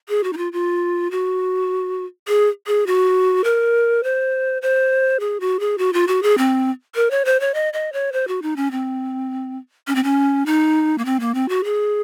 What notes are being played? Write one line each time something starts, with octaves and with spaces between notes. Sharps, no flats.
G#4
F#4
D#4
F4
F4
F#4
G#4
G#4
F#4
A#4
C5
C5
G#4
F#4
G#4
F#4
F4
F#4
G#4
C4
A#4
C#5
C5
C#5
D#5
D#5
C#5
C5
F#4
D#4
C#4
C4
C#4
C4
C#4
D#4
A#3
C4
A#3
C4
F#4
G#4